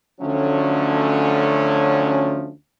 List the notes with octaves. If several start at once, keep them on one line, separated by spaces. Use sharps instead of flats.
D2 D3 F3 F#3 A3 C#4